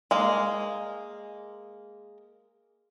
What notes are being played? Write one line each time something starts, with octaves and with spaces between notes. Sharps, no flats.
G#3 A#3